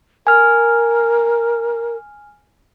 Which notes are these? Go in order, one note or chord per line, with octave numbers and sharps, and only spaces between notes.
A#4 G#5 F6